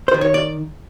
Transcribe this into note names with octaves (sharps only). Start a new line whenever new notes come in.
C5
D#3
C#5
D5